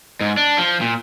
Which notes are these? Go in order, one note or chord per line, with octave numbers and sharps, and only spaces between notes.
G#2
D4
F3
A#2